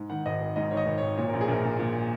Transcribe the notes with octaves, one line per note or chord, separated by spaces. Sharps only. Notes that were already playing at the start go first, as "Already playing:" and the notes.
Already playing: G#2
D#3 F#5
G#1 D#5
G#1
G#2 D#5
D#3 C#5
D#5
G#1
C#5
G#1
A#2 C#5
A#1 A#4
G#4
A#1 A#4
A#2
A#2